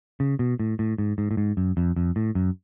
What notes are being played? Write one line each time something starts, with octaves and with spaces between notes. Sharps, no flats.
C#3
B2
A2
A2
G#2
G#2
A2
G#2
F#2
F2
F2
A2
F#2